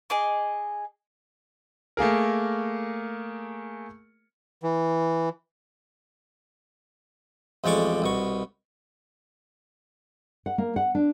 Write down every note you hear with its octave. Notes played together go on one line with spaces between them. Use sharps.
G#4 D#5 D6
A3 A#3 G#4 A#4
E3
A1 F2 G#3 D5 C#6 D6
C2 B2 C#6
F#5
A#3
F#5
D4